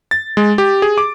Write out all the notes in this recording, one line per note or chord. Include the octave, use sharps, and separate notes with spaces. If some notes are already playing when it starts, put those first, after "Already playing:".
A6
G#3
G4
G#4
D6